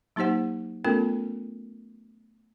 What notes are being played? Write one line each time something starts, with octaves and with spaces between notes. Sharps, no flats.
F#3 A#3 D#4 G4 C5 F#5
A3 B3 C#4 F4 A4 A#4